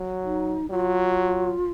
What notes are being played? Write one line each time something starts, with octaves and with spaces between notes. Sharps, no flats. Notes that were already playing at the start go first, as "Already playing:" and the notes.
Already playing: F#3
D#4
F#3 F4